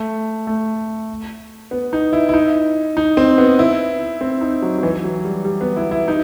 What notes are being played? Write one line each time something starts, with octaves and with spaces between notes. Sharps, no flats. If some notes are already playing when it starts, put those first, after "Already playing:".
Already playing: A3
A3
B3
D#4
E4
E4
D#4
D#4
C4
B3
E4
C4
D#4
F#3
F#3
E3
F#3
G3
G3
B3
E4
E4
D#4